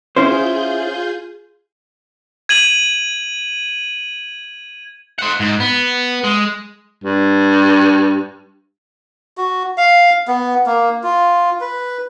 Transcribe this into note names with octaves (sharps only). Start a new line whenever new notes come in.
C#4 E4 F4 G#4 C5 G6
G#6 D#7 F#7
C5 F#5
G#2
B3
G#3
G2
F#4
F5
B3
A#3
F4
B4